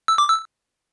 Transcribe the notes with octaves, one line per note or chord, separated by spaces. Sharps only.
E6
D6
E6